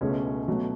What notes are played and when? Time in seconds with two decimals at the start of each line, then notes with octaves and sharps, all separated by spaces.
0.01 C#2 B2 A3 C#4 G#4
0.48 B2 F#3 A3